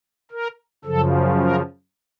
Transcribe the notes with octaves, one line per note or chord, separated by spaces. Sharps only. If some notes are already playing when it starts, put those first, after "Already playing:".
A#4
F#2 C#3 F3 A4
A#4